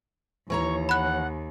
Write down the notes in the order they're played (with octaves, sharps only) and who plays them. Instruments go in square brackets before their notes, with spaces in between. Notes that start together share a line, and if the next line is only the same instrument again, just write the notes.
[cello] D#2 [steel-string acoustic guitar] E3 C#5 A#5 [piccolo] C#6
[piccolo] F#5 [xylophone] B5 F#6